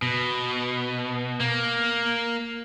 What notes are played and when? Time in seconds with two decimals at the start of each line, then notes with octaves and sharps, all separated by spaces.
0.02 B2
1.40 A#3